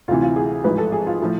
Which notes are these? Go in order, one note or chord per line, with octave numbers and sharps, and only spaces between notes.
D2 C3 E3 F4
F4
G#4
A1 G#2 F3 B4
A4
G#4
F4
A2 F3